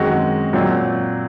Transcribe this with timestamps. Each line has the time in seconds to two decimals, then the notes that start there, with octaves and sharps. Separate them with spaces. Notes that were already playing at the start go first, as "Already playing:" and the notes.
Already playing: F#2 D#3 G#3 C4 F#4
0.53 A#2 F#3 C4